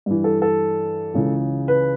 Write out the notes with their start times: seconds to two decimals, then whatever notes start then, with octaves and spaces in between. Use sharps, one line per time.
0.06 G2 E3
0.24 A4
0.42 A4
1.14 C#2 C#3 E3
1.68 B4